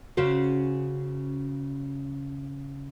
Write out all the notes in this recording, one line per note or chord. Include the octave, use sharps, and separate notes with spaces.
C#3 C#4 F#4 C5